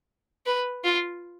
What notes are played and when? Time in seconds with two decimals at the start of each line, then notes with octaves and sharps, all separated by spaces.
0.46 B4
0.84 F4